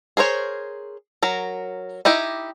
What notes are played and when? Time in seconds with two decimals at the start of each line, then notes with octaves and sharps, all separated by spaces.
0.17 G#4 A#4 C5 C#5
1.23 F#3 A#4
2.05 D#4 E4 G4 D#5